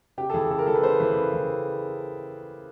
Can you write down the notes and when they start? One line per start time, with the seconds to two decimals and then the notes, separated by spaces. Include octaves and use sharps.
0.17 C#3 G4
0.30 A4
0.34 E3 G#4
0.50 C#3 A4
0.59 A#4
0.67 E3 A4
0.75 B4
0.83 C#3 C5
1.00 E3 B4
1.16 C#3
1.33 E3